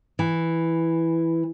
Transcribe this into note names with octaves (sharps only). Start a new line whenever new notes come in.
E3